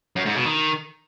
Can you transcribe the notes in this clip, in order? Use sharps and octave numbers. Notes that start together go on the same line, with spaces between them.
F#2
G#2
B2
D#3